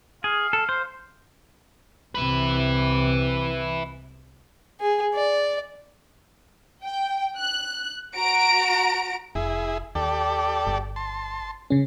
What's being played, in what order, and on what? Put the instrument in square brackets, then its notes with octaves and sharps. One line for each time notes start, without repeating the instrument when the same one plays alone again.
[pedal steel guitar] G#4 [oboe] F5
[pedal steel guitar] A4
C5
[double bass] C2 C3 [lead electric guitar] E4 B4
[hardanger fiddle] G#4
D5
[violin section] G5
F#6
F#4 A#5 D7
[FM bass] F1 [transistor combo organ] E4 G#4
[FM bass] D#2 [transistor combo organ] G4 A4 D5
[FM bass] G1
[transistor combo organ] A5 C6
[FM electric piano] C#3 C#4